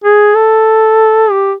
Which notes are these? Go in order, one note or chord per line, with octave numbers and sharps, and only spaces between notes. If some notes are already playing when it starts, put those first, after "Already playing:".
G#4
A4
G4